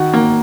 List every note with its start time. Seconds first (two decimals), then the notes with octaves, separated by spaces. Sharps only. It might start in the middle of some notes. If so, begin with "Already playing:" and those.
Already playing: D#3 F#4
0.14 D#3 A#3